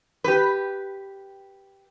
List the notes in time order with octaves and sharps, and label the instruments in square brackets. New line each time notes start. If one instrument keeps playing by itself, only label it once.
[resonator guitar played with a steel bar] G4 B4